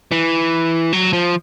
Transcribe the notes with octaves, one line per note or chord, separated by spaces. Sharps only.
E3
F#3
F3